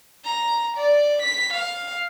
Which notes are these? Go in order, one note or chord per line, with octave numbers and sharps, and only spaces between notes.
A#5
D5
B6
F5